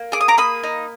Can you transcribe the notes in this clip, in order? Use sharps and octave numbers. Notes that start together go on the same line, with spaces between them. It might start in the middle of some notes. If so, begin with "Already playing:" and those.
Already playing: A#3
G#4 D6
D#6
A#5 D6
A#3 B5 D#6
D#4